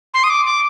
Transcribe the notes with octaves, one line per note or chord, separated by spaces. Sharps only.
C6
D#6
D6
D6